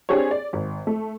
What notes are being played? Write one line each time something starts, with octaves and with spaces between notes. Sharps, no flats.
C4 D4 G4 G#4 C5 C#5
D5
G#1
A3